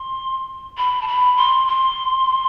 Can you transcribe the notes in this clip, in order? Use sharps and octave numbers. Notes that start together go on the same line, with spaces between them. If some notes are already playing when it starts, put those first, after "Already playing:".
Already playing: C6
B5
A5
B5
C6
C6